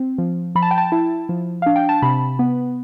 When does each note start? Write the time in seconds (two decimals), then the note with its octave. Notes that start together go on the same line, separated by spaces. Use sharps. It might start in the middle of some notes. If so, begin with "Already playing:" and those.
Already playing: C4
0.18 F3
0.55 F3 B5
0.62 A5
0.71 G5
0.78 A5
0.92 E4
1.29 F3
1.62 D4 F5
1.76 G5
1.89 A5
2.02 C3 B5
2.39 B3